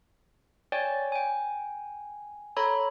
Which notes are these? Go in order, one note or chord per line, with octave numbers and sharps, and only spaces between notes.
C#5 D5 G5 G#5
G5 G#5
A4 C#5 A#5 B5